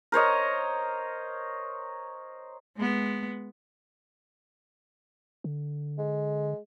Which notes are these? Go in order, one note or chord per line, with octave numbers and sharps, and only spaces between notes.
A#4 C5 C#5 D#5
G#3 B3
D3
G#3